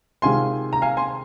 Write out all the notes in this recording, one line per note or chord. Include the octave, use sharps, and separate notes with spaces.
C3 D#3 G#3 C4 F4 G#5 C6
A#5
F5 G#5
G#5 C6